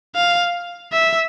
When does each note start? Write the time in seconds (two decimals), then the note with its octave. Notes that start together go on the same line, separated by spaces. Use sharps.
0.16 F5
0.92 E5